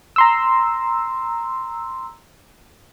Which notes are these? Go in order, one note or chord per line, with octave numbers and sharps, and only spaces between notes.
A#5 C6 E6